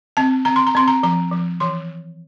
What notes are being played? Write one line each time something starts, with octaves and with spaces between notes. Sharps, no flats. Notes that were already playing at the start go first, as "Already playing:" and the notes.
C4 A5
C4 A#5
C6
A#5
C4 C6
A#5
F3 A#5
F3
E3 C6